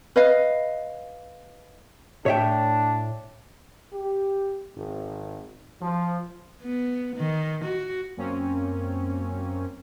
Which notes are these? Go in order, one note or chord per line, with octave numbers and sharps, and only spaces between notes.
B4 D#5 F5
A2 D4 C#5 E5 G5
G4
G#1
F3
B3
D#3
F#4
F#2 A#3 C4 C#4